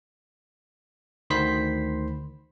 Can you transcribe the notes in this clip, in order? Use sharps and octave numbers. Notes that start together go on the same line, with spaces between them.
D2 D#3 C5 B5 C6 B6